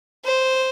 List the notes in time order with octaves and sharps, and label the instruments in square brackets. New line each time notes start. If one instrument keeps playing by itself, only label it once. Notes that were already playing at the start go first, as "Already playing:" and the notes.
[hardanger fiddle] C5